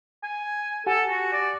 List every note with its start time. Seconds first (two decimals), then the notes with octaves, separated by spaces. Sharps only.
0.23 G#5
0.87 G4 A4 F#5 G#5
1.09 F#4
1.33 D5